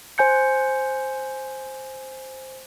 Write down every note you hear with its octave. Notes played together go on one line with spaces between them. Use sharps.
C5 G#5 G6 C#7